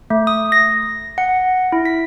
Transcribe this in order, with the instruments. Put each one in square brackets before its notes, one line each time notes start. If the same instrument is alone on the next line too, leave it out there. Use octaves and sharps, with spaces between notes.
[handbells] A3
D#6
A#6
F#5
E4
B6